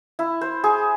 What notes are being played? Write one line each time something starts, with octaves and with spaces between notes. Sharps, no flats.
E4
C5
G#4